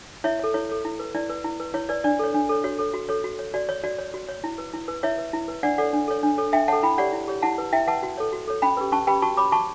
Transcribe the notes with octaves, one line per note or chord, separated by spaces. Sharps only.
E4 C#5 E5
A4 C#5
E4 C#5
A4 C#5
E4
B4
E4 D5
B4
E4
B4
E4 C#5
B4 D5
D4 D5
A4 C#5
D4
A4 C#5
F#4 C#5
A4 C#5
F#4
A4 C#5
F#4
C#5
F#4 D5
C#5
F#4 D5
C#5
F#4
C#5
E4
B4
E4
B4
E4 C#5 E5
B4
E4
B4
D4 D5 F#5
A4 C#5 D5 F#5
D4
A4 C#5
D4
A4 C#5
D4 E5 G5
A4 C#5 F#5 A5
E4 G5 B5
G4 C#5 D5 F#5
E4
G4 C#5
E4 F#5 A5
B4
E4 E5 G5
B4 F#5 A5
F#4
A4 C#5
F#4
A4 C#5
C#4 G5 B5
G4 B4
C#4 A5 C#6
G4 B4 G5 B5
F#4 A5 C#6
C#5 B5 D6
F#4 A5 C#6